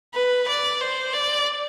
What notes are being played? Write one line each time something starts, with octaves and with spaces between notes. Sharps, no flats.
B4
D5
C5
D5